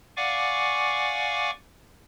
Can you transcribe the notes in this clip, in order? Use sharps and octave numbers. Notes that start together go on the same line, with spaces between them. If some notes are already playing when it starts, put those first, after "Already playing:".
D5 F5 F#5 G#5 C#6 D6